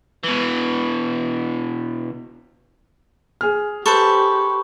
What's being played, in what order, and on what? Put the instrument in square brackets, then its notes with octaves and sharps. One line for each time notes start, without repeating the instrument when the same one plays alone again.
[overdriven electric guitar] B2 E3
[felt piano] G#4 F6
[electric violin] G4 [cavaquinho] A4 B4 C5 [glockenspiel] C#6